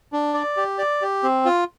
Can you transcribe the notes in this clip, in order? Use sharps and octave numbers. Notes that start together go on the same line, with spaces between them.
D4
D5
G4
D5
G4
C4
F4